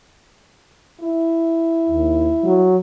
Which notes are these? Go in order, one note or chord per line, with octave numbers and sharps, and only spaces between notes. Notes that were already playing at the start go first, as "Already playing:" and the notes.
E4
D#2
F#3